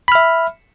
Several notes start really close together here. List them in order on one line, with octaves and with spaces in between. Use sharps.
B5 F6 E5